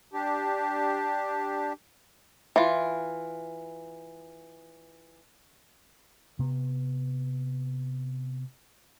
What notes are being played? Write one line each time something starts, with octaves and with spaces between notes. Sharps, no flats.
D4 G4
E3 F4
C3 B3